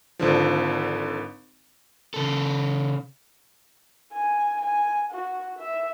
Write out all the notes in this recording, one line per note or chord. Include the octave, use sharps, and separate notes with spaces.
G#1 D3 F3
C#3 A4
G#5
G#5
F#4
E5